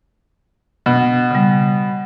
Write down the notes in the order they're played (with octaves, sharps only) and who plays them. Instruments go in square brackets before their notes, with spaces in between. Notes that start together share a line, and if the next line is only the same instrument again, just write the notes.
[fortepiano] B2
[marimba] C#3 G3